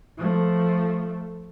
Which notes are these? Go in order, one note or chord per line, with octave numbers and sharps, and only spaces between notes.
F3 A3